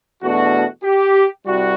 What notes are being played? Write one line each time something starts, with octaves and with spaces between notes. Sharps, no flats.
E2 B2 A3 D4 F#4
G4
C2 C3 G3 F#4